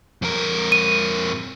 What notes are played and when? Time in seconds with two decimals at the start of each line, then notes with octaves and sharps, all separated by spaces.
0.22 F2 A#4
0.72 D#7